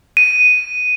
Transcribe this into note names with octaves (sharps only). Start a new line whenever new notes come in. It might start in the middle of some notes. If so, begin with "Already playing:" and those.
D#7